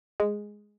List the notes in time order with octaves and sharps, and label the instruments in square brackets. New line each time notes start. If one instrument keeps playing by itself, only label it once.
[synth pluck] G#3